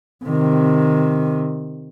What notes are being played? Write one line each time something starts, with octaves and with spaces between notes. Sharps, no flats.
C3 D#3